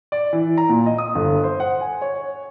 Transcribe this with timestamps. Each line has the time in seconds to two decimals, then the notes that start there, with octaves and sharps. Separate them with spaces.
0.12 D5
0.33 E3
0.58 A#5
0.69 A#2
0.86 D#5
0.98 D#6
1.15 G1
1.44 C5
1.60 F#5
1.81 G#5
2.02 C#5